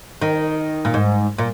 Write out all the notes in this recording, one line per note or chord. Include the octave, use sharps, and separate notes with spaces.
D#3
A#2
G#2
A#2